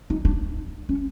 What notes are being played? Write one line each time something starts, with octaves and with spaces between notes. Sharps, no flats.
D#4
D4
C#4